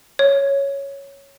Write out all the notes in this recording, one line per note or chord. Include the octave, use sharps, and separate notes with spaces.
C#5